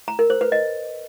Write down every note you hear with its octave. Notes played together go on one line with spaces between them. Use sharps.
A#5
A#4
C5
B4
D#5